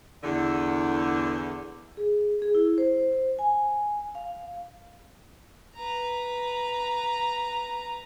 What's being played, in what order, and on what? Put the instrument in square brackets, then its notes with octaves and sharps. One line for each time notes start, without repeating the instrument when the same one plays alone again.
[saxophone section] E2 D3
[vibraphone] G#4
G#4
E4
C5
G#5
F5
[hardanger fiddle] B4 A#5